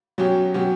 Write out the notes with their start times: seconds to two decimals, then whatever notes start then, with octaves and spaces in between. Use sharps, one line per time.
0.18 B2 F#3 C#4 G4
0.54 B2 F#3 C#4 G4